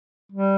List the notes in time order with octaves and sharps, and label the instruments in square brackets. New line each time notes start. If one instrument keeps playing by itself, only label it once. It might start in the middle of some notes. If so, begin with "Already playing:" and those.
[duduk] G3